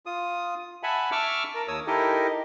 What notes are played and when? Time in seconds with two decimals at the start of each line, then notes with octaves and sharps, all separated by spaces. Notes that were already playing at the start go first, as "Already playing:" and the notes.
0.06 F4 D#6
0.83 E5 F#5 G#5 A5 B5
1.12 E5 A5 C#6 D6 E6 F6
1.55 A#4 A5
1.68 D#2 C#5 D#6 E6
1.87 D#4 E4 G4 A4 A#4 D#5